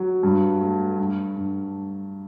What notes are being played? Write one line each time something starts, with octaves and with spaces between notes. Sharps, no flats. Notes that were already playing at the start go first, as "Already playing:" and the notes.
Already playing: F#3 F#5
G2
A3
G2 A5
G2